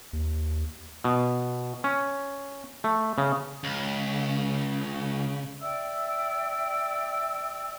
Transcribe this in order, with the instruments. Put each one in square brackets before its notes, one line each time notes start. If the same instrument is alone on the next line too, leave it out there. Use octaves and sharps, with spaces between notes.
[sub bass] D#2
[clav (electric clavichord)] B2
C#4
A3
C#3
[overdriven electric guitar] C#2 [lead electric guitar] C#3
[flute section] D5 E5 G5 E6